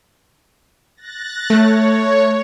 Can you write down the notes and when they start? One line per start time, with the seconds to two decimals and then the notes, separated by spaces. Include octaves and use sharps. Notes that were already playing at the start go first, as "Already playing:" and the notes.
0.96 F#6 A6 A#6
1.50 A3 C#5